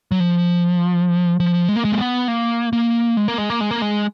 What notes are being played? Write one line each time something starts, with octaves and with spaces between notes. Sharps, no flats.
F#3
F3
F3
G#3
A#3
G#3
A#3
B3
A#3
A#3
G#3
A#3
G#3
A#3
G#3
A#3
G#3